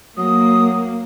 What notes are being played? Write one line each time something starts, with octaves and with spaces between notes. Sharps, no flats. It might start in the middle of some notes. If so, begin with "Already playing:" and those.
F#3 A#3 D#6